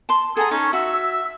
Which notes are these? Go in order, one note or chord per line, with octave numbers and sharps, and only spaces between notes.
A5 C6
G#4 A4 F#5 G#5 A#5
C#4 D#4 A4 C#6
F#4 E5 E6
E6